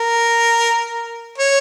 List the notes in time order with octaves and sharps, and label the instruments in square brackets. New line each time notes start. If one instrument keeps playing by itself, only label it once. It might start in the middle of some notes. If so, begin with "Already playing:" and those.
Already playing: [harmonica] A#4
C#5